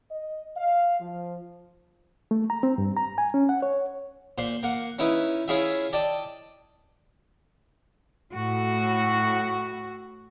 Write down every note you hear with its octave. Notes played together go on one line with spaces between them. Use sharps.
D#5
F5
F3
A3
A#5
C4
G2
A#5
G#5
C#4
F#5
C#5
A#2 C5 C6
A#3 F#5
C#4 D#4 E4 B4
C#4 E4 F4 G#4 E5
D5 D#5 G5 A5
A2 F#4